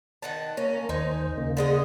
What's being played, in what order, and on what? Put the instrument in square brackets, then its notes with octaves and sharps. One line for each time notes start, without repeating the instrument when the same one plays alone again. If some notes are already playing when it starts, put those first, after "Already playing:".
[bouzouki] D#3 F#5 A5
[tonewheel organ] A#3 A#5 [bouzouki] C#4
[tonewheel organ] D#2 C5 [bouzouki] D#4 G#5
[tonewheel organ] C#3 A#3
[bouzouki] D3 G#3 D#5